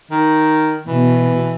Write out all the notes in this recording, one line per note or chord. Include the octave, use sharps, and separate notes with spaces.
D#3
B2 E3